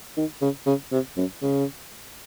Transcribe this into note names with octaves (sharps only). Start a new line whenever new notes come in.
D#3
C#3
C#3
C3
F#2
C#3